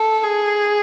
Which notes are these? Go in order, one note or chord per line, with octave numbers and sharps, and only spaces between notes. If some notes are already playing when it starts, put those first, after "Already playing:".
Already playing: A4
G#4